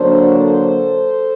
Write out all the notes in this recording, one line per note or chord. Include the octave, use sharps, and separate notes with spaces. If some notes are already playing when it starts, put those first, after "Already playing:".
Already playing: D3 F#3 A#3 D4 A4 C5
A4 C5